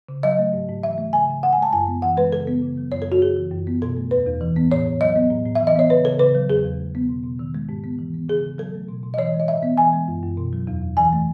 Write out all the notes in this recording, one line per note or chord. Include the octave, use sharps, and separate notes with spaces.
C#3
F#3 D#5
A3
G#2
G#2
E3 E5
A3
C#3 G#5
C#3
C#3 F#5
G#5
G#3 A5
F#2 G#5
B3
E3 F#5
G#3 B4
C#3 A4
B3
C#3
F#3
F#2 C#5
A4
F#2 F#4
C#3 G#4
E3
F#2
B3
B2 A4
A3
E2 B4
E2
E3
B3
A2 C#5
A2
F#3 D#5
B3
A2
A2
E5
E3
D#5
B3 C#5
C#3 B4
C#3 A4
C#3 B4
F#3
E2 G#4
E2
G#3
B3
B2
B2
D#3
G#3
G#2
B3
E3
B3
C#3 G#4
C#3
F#3 A4
A3
B2
B2
D#5
E3 C#5
G#3
D#5
A2 E5
B3
E3 G#5
G#3
F#2
F#2
B2
F#3
E2
E2
E3 G#5
A3